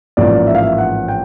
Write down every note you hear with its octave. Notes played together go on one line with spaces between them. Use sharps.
A1 G#2 F3 A#3 D5
E5
F5
E5
F#5
G5